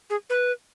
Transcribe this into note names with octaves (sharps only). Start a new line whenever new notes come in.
G#4
B4